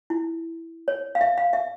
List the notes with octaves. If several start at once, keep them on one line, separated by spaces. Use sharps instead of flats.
E4
C#5
F5
E5
F5
E5